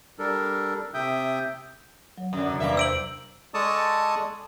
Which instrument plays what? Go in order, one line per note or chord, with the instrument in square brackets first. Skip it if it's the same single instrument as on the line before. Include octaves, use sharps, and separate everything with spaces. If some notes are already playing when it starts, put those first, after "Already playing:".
[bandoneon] G3 D4 A4 A#4
C3 E5 G5 D#6 G6
[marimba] F#3 C#5
[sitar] F#2 D3
[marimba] E2 C3 D4
[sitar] G2 A#3 E5 [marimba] A#4
[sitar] C5 [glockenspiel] E6 D7 F#7
[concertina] G#3 A4 D5 A5 C#6 D#6